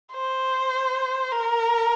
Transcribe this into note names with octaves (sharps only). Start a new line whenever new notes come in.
C5
A#4